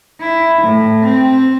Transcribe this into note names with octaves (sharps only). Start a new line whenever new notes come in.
E4
A2
C4